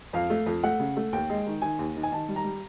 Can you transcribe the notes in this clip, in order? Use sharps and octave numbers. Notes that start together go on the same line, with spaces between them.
F2 F5
A3
F2
A3 F#5
C#3
A3
D#2 G5
G#3
D#3
D#3 G#5
D#2
D#3
G#5
D#3 A5
G3
A#5
G3